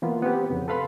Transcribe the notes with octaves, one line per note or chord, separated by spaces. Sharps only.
E3 A#3 B3 F4
B3 C4 G4
F2 C#3
A4 B4 F5 B5 C6